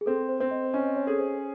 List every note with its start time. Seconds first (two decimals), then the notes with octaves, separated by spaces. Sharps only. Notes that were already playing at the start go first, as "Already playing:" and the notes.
0.01 G#4
0.06 C4 A4
0.29 C5
0.40 C4
0.51 D#5
0.74 C#4 D#5
0.86 D#5
0.96 C#5
1.07 G#4 A4
1.19 C5